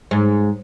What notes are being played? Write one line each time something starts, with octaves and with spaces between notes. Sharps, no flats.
G#2